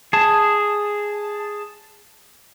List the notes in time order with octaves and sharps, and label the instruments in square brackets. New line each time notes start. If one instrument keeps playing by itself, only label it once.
[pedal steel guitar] G#4 A5